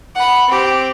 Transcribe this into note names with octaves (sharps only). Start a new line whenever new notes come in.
F#5 B5
C4 G4